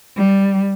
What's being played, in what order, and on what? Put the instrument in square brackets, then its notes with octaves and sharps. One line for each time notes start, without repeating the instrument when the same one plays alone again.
[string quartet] G3